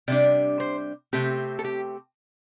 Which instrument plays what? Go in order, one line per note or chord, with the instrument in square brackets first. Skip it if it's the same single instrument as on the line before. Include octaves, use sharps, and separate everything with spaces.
[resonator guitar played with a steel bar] C3 G3 D4 D5
C5
C3 A3 C4 G4
A4
G4